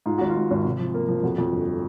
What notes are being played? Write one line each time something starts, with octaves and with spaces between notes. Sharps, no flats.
G#2 F4
G#1 F#4
F4
G#2
G#1
C3
F3
A#3
F3
F2 F#4
F2
G1